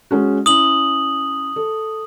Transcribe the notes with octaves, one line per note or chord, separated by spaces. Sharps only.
G#3 C#4 F#4
C#4 E4 D#6 F#7
A4